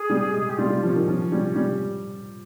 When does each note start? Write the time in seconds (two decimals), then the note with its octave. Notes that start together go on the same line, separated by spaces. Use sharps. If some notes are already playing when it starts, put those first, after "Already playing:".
Already playing: G#4
0.10 G3
0.34 G#3
0.49 G4
0.58 G3 F4
0.70 G3
0.83 F3 C#4
0.96 D#3
1.08 F3
1.32 G3
1.56 G3